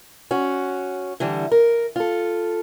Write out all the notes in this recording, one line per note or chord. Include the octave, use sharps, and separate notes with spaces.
C#4 F#4
D3 E3 G3
A#4
F4 A4